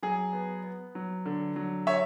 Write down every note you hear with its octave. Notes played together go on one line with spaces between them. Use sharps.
F#3 G#4
B3
B3
F#3
D3
F#3
C#5 E5